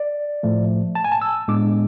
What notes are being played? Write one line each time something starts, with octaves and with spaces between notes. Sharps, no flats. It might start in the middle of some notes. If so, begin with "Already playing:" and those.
Already playing: D5
A2 F3 A3
A5
G#5
A5
E6
A2 G#3 B3 D4 D6